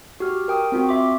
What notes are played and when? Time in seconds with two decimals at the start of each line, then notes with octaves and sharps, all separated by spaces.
0.20 F#4 G4 F6
0.48 A#4 G5 D#6
0.72 C4 F4 F#4
0.89 E5 C6 D6